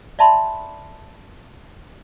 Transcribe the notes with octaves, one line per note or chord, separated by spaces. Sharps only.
D5 E5 A5 B5 C6